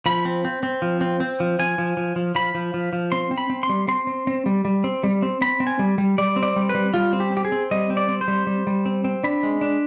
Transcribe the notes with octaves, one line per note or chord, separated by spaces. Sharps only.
F3 B5
C4
C4
C4
F3
C4
C4
F3
F3 G#5
F3
F3
F3
F3 B5
F3
F3
F3
C4 C6
C4
B5
C4
C6
G3
C4 C6
C4
C4
G3
G3
C4
G3
C4
C4 B5
C4
G#5
G3
G3
G3 D5
C4
D5
G3
B4
G3
G3 F4
C4
G4
C4 G4
G#4
C4
G3 D#5
C4
D5
C4
C5
G3
G3
G3
C4
C4
D4 B5
G#3
D4